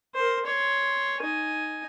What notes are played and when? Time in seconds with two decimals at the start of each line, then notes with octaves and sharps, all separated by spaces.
0.15 A#4 C5
0.46 C#5 C6
1.21 D#4 G#5